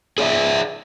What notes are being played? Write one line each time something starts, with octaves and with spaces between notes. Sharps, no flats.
G#4 C#5 D5 E5